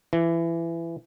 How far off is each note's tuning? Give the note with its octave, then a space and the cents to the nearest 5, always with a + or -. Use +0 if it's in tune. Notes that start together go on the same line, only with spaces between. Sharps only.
E3 +20